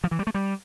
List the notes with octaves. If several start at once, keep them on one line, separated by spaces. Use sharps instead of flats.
F3
E3
G3
A3
G3